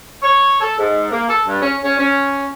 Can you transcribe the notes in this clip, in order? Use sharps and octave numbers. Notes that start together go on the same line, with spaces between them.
C#5
A4
G#2
A#3
A4
G2
C#4
C#4
C#4